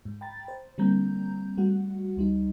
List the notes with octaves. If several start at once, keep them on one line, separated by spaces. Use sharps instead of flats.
G#2
G5 A#5 B5 A6
C5
D3 G3 A#3 C4 A#5 G6
G3 A3 F#4 F#5
C#2 G3 D#4